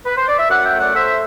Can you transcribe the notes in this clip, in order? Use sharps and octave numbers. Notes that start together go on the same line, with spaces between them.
B4
C5
D5
E5
F#2 D5 F#5
E5 G5
A3
D5 F#5
A3 C5 E5